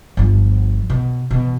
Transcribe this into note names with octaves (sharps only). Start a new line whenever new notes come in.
G1 F3
B2
B2 E3